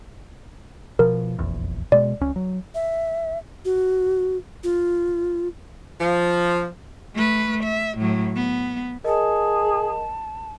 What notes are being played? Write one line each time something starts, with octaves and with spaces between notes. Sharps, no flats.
B2 F3 A#4
F1 A#1 E2
B2 G#3 D5
C#2 C#4
F#3
E5
F#4
F4
F3
A3 B4
E5
A2 F#3
B3
G#4 A#4 D#5 A5